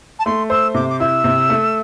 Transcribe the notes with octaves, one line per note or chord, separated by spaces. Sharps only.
A5
A3 C6
C5 E6
C3 D6
D6
E4 E6
C3
A3